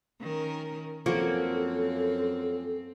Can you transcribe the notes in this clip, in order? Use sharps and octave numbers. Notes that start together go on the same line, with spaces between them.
D#3 C#4 A#4
F#2 F3 A#3 C4 C#4 F#4 A4